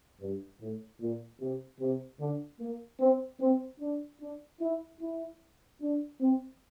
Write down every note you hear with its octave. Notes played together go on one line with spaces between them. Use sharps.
G2
A2
A#2
C3
C3
D3
A#3
C4
C4
D4
D4
E4
E4
D4
C4